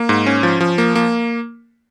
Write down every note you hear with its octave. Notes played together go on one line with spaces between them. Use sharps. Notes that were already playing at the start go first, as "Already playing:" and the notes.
Already playing: A#3
G#2
C#4
F3
F3
A#3
A#3